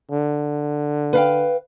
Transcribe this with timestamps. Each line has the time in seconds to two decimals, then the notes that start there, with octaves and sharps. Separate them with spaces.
0.11 D3
1.13 B4 F5 G5